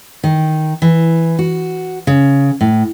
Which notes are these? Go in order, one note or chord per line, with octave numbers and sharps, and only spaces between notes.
D#3
E3
F#4
C#3
A2